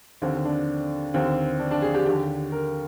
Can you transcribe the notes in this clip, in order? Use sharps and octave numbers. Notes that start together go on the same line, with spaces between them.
D#2 D3 C4
D4
D#2 D3 C4
D4
D4
G#4
G4
D#2 D3 G4
A#4